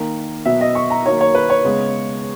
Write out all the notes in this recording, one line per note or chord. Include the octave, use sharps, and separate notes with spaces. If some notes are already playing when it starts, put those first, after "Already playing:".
Already playing: D#3 A#3
B2 F#3 B3 E5
D#5
C#6
A#5
D#3 F#3 A#3 C#5
C#5
B4
C#5
C#3 G#3 B3